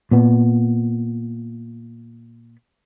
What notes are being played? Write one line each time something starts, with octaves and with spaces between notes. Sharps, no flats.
A#2 B3